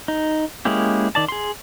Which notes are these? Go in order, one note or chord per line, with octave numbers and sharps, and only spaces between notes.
D#4
G#3 A#3 C#4 E4 G4
D#3 D5 A5
G#4 C6